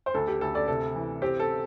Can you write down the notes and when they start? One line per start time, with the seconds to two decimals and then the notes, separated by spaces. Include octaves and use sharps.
0.06 C5
0.14 D2 A4
0.28 G4
0.41 D2 A4
0.55 A4 D5
0.68 C3 A4
0.95 E3
1.22 C4 G4
1.39 A4